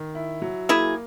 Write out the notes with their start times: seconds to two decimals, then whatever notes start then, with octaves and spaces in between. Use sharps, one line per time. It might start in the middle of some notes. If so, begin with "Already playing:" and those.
Already playing: D#3
0.15 E4
0.42 F#3
0.69 A#3 E4 G#4